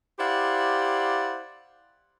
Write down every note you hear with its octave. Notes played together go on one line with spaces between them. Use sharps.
E4 G4 C5 D5 F5 F#5